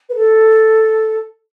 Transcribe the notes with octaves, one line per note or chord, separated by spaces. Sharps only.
B4
A4